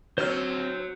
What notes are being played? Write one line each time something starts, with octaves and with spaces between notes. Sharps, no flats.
D3 F#3 C4 C5 F6